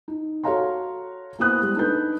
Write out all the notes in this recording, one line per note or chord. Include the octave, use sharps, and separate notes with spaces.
D#4
F#4 A4 C#5 F5 A#5 C6
A#3 B3 E4 C5 D#6 F#6
G3 G#3
D4 D#4 A4 B4 G6